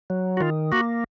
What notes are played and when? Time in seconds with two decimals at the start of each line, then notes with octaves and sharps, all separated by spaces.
0.10 F#3
0.37 F#4
0.40 D#3 F4
0.72 A#3 F#4